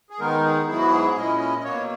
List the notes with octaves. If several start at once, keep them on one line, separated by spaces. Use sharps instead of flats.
G#4
D#3 G#3 B3 D#4 A#4
G#4
G#2 F#3 B3 E4 G#4
F#4
G#4
A#2 G#3 C#4 E4 D#5
D#5
D#5
B2 F#3 A#3 C#5